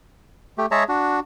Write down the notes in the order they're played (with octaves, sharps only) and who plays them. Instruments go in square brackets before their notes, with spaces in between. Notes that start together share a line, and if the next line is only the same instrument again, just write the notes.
[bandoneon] A3 G4
G#3 G#4 C#5 E5 A5 A#5
D4 F#4